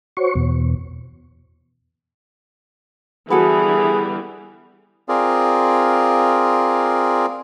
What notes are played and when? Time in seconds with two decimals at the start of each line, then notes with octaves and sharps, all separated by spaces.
0.17 F#4 C5 C#5 C#6
0.35 E2 B2
3.30 D3 E3 G3 B3 E4 F#4 G#4 A4
5.09 C4 F4 G#4 A#4 D5